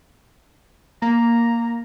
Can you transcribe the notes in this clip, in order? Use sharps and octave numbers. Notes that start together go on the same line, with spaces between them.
A#3 A#5